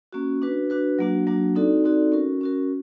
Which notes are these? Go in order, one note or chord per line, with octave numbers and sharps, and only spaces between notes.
A#3 C#4 F#4
D4 F#4 B4
D4 F#4 B4
F#3 A#3 D4 F#4
F#3 A#3 D4 F#4
C4 D#4 F#4 A4 D5
C4 D#4 F#4 A4 D5
C#4 F#4 A#4
C#4 F#4 A#4